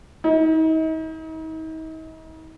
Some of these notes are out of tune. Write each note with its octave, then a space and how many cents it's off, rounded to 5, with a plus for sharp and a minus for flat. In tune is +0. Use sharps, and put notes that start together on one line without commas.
D#4 +40